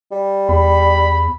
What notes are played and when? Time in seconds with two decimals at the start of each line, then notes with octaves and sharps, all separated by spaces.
0.11 G3
0.49 E2 B5